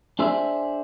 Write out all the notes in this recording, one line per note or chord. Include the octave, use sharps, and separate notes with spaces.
D4 G#4 C5 E5